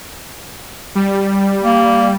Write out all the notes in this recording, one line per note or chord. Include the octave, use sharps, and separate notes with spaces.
G3
A#3